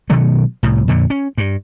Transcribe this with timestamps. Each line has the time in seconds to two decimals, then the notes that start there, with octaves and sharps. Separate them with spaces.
0.10 B2 D#3 F#3 A3
0.63 C2 A2
0.88 F2 A#2 D3
1.10 C#4
1.38 G2